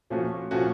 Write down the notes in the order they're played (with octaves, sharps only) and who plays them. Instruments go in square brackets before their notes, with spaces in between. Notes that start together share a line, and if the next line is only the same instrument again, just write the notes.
[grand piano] A#2 F3 A3 C#4 F#4
A#2 F3 A3 C#4 F#4